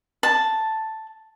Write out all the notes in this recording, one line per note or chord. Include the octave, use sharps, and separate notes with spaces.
A5